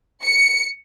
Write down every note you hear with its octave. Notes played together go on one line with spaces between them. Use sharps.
C#7